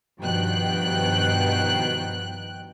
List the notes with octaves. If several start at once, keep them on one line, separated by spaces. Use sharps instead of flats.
G2 B2 D#3 F3 G5 F#6